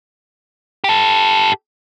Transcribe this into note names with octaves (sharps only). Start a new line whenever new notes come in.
G4 A4